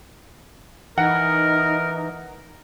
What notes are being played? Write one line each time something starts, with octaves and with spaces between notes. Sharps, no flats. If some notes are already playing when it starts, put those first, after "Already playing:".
E3 D#4 A#4 F#5